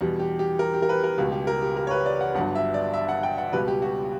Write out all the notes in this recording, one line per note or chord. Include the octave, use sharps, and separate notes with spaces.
E2 B2 G3
G4
G4
A#4
G4
A#4
B4
A#4
C#2 B2 G3 F#4
G4
A#4
G4
A#4
C#5
B4
D5
F#5
G1 G2 F#3 F#5
E5
D5
E5
F#5
G5
F#5
C#2 B2 G3 B4
G4
F#4